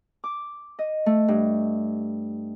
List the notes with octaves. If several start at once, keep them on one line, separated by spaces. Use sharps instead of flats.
D6
D#5
A3
G2